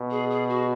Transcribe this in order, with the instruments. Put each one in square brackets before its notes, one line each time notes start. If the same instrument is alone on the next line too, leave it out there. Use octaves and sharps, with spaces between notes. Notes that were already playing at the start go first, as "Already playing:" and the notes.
Already playing: [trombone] B2
[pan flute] G#4
G#4
F#4